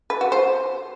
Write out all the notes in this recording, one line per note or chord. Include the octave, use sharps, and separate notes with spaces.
B4
F#4
C5